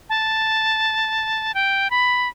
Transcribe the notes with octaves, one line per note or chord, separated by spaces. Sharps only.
A5
G5
B5